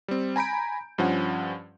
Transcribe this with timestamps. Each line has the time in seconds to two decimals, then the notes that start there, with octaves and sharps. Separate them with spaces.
0.08 G3 C4
0.36 G#5 A#5 B5 G6 D7
0.98 G2 F3 C#4 F#5